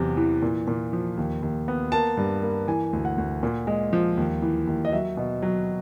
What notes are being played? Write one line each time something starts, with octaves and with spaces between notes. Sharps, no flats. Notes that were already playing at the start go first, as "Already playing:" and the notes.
Already playing: E2 C3 F#3
E3
A#2
A#2
F3
D#2
D#2
B3
A#3 A5
G2
A#3
E3 G#5
D2
F#5
D2
A#2
G#3
F3
D#2
E3
D#2
D#5
F#3 E5
B2
F#3